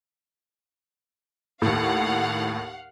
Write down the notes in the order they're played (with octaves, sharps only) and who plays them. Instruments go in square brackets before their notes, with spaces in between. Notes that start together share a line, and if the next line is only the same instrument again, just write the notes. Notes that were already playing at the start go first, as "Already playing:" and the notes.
[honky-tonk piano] D#2 A2 [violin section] F5 F#5